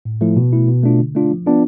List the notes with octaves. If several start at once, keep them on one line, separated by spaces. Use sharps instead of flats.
A2
F3 A3 E4
B2
A3 E4
B2
A3 D4 F4
D3
A3 D4 F4
F3
B3 D4 F4